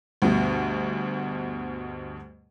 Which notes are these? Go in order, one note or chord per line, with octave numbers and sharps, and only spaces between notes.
D2 G2 B2